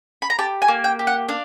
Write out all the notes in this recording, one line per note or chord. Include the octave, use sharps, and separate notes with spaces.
B5
A#5
G4 A5
G#5
A#3
G5
G4
F#5
D4 F5